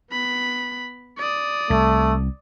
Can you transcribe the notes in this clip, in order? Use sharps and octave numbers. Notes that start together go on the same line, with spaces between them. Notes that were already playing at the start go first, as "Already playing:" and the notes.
B3 B5
D5 D#6
C2 A3